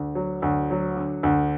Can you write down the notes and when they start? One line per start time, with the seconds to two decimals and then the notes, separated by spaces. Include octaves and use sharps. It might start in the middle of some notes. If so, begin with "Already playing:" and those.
Already playing: D2
0.15 F#3
0.42 D2
0.70 F#3
0.97 D3
1.23 D2